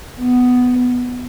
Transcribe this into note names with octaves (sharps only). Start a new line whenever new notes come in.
B3